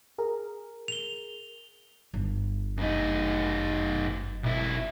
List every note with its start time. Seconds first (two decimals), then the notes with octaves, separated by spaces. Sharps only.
0.18 G#4 A#4
0.88 F7 G7
2.14 G1
2.77 F#2 D#4
4.43 B1 E4